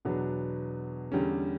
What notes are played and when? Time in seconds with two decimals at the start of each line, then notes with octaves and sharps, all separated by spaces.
0.05 E2 B2 F#3 B3 D4
1.12 E2 D3 G3 C#4